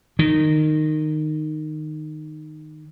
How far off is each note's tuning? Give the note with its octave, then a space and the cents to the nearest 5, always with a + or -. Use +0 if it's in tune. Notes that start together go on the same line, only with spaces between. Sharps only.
D#3 -15